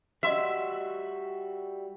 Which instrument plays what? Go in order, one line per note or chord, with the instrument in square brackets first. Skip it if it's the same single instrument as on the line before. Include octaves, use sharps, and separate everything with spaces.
[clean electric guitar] G3 F#4 [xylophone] D#5 C6 E6 [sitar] E5